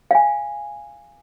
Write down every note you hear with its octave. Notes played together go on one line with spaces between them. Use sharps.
F5 G#5